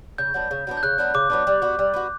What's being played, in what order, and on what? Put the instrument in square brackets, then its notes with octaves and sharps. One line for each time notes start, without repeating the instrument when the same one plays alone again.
[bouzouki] C#3 [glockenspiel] G6
[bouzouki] F#3 B3 D4
C#3
F#3 B3 D4
[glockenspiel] G6
[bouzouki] C#3 [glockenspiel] F#6
[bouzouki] F#3 B3 D4
[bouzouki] C#3 [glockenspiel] D6
[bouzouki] F#3 B3 D4
G3
B3 F#4
G3
B3 F#4